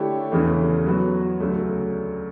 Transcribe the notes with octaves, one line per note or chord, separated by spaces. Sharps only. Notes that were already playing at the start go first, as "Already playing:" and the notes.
Already playing: D3 A3 E4 G4 C#5
E2 C#3 E3 A3
F#3 B3 F#4
D2 C#3 F#3 A3